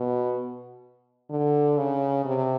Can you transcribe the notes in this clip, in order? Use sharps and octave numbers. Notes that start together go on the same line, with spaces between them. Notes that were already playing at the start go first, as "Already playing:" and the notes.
Already playing: B2
D3
C#3
C3